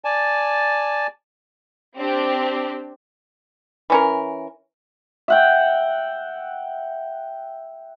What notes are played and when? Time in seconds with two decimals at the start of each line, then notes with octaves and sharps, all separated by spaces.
0.05 D5 G#5 A5
1.96 C4 D4 G4
3.90 E3 C#4 A#4
5.28 E5 F#5 G5